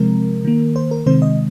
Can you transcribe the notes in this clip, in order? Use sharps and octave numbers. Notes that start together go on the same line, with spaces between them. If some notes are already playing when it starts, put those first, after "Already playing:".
Already playing: C3 F3 G#3 C4 A#4
D#3 A#3
C5
A#4
C3 D#3 G#3 C4 C5
D#5